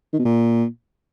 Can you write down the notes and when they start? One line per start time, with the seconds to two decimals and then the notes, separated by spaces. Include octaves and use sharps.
0.13 D#3
0.19 B2
0.25 A#2